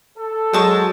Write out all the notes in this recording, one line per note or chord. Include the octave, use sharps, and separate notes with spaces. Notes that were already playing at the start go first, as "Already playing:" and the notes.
A4
F#3 G#3 C5 A5 C#6